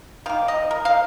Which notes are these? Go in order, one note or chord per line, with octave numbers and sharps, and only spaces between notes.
D#3 A#3 F5
D#5
A#4
F5